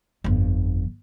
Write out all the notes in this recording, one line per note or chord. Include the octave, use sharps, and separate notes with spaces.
G1 F2